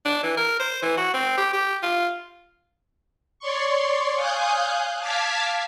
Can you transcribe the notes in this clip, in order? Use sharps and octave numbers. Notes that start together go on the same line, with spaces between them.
D4
E3
A#4
C5
E3
F#4
C4
G4
G4
F4
C#5 D5 C6 C#6
F5 G#5 D#6 F#6 G6
F5 A5 D6 F6 G#6 B6